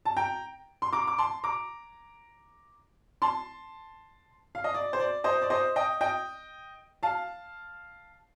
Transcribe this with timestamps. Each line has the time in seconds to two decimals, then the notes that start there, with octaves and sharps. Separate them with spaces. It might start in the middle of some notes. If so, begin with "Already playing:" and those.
0.05 A5
0.17 G5 A#5
0.82 C6
0.93 A#5 D6
1.07 D6
1.18 A5 C6
1.44 A#5 D6
3.22 A5 C6
4.55 F5
4.64 D#5
4.74 D5
4.93 C5
5.00 D5
5.24 C5 D#5
5.42 D5
5.50 C5 D#5
5.76 D#5 G5
6.01 D#5 G5
7.03 F5 A5